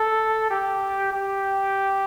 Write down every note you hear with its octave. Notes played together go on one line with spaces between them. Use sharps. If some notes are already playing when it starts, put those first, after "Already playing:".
Already playing: A4
G4
G4